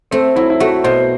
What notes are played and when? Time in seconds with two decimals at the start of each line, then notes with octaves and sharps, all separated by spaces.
0.11 A3 C4
0.36 F#3 E4
0.50 E4
0.60 A3 F#4
0.84 B2 C5